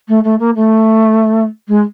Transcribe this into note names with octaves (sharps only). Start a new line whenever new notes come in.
A3
A3
A#3
A3
G#3